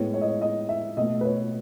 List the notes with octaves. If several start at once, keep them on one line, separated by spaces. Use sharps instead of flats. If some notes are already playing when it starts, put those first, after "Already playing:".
Already playing: A2 G#3 B3 C#5
C#5
D#5
C#5
D#5
E5
B2 A3 D#5
B4
C#5